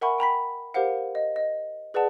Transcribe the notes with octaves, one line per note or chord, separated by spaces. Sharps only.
A#4 E5 F#5 G#5 B5 C#6
G5 A#5 B5 B6
G4 A#4 C5 F5 F#5
D#5
D#5
G#4 B4 D5 F#5 A5